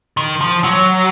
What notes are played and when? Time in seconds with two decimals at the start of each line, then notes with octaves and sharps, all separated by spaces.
0.17 D#3
0.41 F3
0.64 F#3